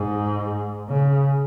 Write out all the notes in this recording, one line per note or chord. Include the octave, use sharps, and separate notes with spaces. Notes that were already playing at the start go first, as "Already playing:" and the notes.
Already playing: G#2
C#3